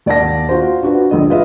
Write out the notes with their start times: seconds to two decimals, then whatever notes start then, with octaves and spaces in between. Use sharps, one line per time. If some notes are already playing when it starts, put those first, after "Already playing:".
0.06 D#2 D5 F#5 A5 A#6
0.49 F4 F#4 C5
0.83 D4 F#4 B4
1.11 A#1 D3 D#5
1.30 G#3 F4 B4 D#5 E5